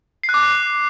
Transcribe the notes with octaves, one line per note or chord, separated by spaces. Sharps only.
C7
F#6
D6